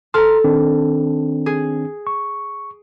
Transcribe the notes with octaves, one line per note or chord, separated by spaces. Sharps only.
A4 A5 A#5 C6 F6
D#3 C4 D4
G#4
C#6